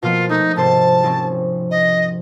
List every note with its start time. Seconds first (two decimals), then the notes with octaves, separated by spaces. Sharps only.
0.02 B2 F3 A#3 F4
0.29 A3 D#4
0.56 G#1 C3 C5 A5
1.03 F3 C4 C#4
1.71 D#5